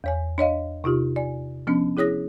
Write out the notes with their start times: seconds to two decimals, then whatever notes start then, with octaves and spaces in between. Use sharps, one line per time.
0.04 E2 C#5 G#5
0.38 D4 C#5 D#5 F5
0.84 C3 D#4 F4 G4
1.16 D5 G#5
1.67 F3 B3 C#4 D4
1.97 E4 G#4 C#5 D#6 A#6